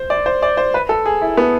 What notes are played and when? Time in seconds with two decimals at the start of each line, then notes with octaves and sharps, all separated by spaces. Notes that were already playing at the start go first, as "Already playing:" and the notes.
Already playing: C5
0.10 D5
0.26 C5
0.42 D5
0.57 C5
0.74 B4
0.89 A4
1.06 G#4
1.22 E4
1.37 B3